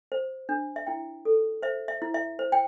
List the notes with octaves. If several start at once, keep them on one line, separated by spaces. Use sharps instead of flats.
C5
D4
E5
E4 G5
A4
C5 E5
E5
E4
E5
C5
G5